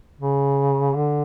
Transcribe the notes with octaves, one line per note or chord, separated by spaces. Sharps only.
C#3
D3